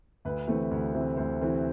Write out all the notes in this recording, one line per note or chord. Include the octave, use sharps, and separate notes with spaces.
D2 B4
C3 E3 A3 C4
D2
C3 E3 A3 C4
D2 C5
C3 E3 A3 C4